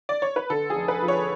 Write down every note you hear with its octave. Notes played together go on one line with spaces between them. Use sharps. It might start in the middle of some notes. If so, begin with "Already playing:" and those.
D5
C#5
B4
D3 A4
G#4
F1
B4
F3
C#5